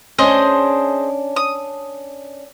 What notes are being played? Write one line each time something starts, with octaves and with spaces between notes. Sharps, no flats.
C#4 D4 G#4 C5 D#5
D#6